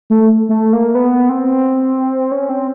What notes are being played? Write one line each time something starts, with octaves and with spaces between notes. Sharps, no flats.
A3
A3
A#3
B3
C4
C#4
C4